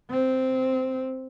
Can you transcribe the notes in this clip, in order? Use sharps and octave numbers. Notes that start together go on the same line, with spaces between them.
C4